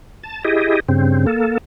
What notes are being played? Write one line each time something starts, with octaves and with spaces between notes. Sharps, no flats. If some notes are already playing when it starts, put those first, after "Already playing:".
A5
E4 G4 G#4 D#5
G2 C#3 C4
A#3 A4